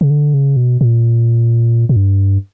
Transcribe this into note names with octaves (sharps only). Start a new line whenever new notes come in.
C#3
D3
C#3
B2
A#2
A#2
G2